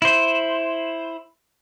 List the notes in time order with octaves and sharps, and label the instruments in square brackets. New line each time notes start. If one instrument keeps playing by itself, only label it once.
[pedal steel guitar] E4 C5